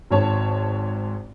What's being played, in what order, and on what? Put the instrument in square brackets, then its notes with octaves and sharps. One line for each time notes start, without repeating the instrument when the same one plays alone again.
[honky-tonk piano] G#1 G#2 C#5 A5